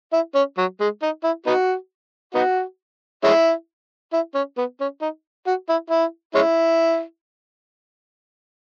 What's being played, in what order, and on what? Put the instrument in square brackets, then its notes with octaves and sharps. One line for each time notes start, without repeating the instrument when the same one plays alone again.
[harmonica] E4
C#4
F#3
G#3
D#4
E4
B3 D#4 F#4
B3 D#4 F#4
G#3 C#4 E4
E4
C#4
B3
C#4
D#4
F#4
E4
E4
G#3 C#4 E4